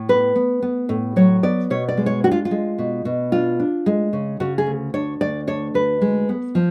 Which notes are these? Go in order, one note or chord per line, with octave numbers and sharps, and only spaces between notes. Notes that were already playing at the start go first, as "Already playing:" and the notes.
Already playing: A2
B3 B4
B3
B3
A2
F#3 C#5
B3 D5
B2 C#5
D5
G#3
C#5
D4 F#4
F4
F4
G#3
B2
B2
D4 F4
D4
G#3
C#3
C#3 F#4
G#4
D2
D4 C#5
D2 D5
D4 C#5
D2 B4
G#3
B3
F3